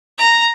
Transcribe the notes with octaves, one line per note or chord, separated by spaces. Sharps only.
A#5